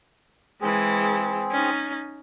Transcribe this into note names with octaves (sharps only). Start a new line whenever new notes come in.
E3 G#3 C4 G#4
C#4 D#4